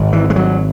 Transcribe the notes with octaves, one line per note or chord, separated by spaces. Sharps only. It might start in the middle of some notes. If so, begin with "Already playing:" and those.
Already playing: G#1 G#2
E3
G#3
F#3